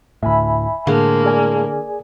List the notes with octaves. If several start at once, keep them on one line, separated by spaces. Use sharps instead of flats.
D2 A2 E5 G#5 B5
A2 D3 G#3 A#3 F5
G#4 D5 G#5